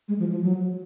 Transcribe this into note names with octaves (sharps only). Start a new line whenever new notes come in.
G#3
F3
F3
F#3